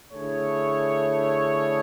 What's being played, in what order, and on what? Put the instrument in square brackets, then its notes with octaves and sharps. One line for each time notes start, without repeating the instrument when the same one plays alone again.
[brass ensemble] D3 A3 E4 G#4 C#5